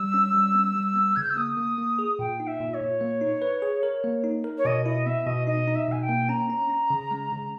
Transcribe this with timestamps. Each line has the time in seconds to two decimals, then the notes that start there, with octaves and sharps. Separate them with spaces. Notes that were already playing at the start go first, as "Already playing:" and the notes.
Already playing: G3 E6
0.14 C#4
0.34 G3
0.55 B3
0.76 G3
0.96 B3
1.15 C#3 G#6
1.23 G6
1.29 E6
1.37 A#3 D#6
1.57 A#3
1.78 A#3
1.99 G#4
2.19 A#2 G5
2.40 D#4
2.47 E5
2.60 A#2
2.74 C#5
2.81 A#2
3.01 A#3
3.21 D#4
3.42 B4
3.62 G#4
3.83 A#4
4.04 A#3
4.24 D#4
4.44 A#4
4.57 C#5
4.65 B2 D#5
4.85 E4 D#5
5.06 B3 E5
5.26 B2 D#5
5.47 D#4 D#5
5.67 D#4
5.75 E5
5.88 B2 G#5
6.02 G5
6.09 A#3
6.29 C#4 A#5
6.50 C#4
6.70 C#4
6.90 C#3
7.11 G#3
7.32 C#3